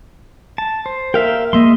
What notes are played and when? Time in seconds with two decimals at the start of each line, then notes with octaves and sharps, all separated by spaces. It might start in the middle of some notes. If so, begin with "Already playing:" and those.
0.58 A5
0.86 C5
1.14 A#4 E5 F5 G5
1.53 G#3 A#3 D#5 E5 C6